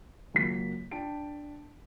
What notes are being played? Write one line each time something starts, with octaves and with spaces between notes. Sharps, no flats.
C#2 F#2 A#3 B6
D4 G5 A5 D7